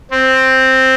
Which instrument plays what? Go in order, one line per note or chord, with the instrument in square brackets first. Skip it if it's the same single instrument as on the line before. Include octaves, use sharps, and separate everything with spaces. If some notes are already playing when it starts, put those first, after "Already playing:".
[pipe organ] C4